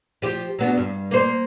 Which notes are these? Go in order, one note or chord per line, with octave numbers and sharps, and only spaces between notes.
F3 G4
F#3 B3 D4
G2
A#3 C5